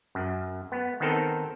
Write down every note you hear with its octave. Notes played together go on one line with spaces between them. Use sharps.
F#2
B3
D#3 B3 C4 D#4 A4 A#4